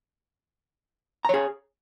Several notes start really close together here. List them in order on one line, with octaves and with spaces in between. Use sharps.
A#5 C#5 G#4